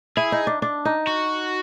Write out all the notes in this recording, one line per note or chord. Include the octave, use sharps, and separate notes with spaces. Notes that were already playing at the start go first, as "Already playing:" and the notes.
E4 G#4
D#4
D4
D4
D#4
F#4